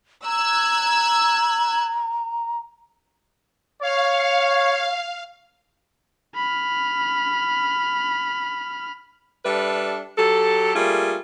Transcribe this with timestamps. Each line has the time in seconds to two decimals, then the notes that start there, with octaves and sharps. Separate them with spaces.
0.25 A#5 E6 F#6 G#6
3.82 C#5 F5
6.35 B5 F6
9.45 G3 D4 A4 B4 E5
10.18 F#3 G4 A4
10.75 G3 A3 A#3 F4 G#4